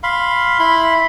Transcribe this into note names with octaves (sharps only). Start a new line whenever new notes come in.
F5 B5 C6
E4 B5 C6